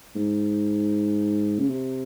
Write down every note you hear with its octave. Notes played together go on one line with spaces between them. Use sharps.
G#2
C#3
C3